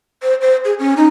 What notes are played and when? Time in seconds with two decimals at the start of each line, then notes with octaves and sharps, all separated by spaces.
0.22 C5
0.41 C5
0.65 G#4
0.79 C#4
0.97 D#4